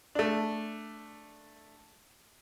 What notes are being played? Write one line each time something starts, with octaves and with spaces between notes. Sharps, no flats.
A3 D4